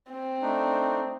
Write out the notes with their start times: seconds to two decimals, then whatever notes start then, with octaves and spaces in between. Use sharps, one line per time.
0.11 C4
0.42 A3 D4 D#4